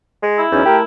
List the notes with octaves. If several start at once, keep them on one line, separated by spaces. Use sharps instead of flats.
G#3
E4
E2 F#3 C#4 D#4
A3 G4 A#4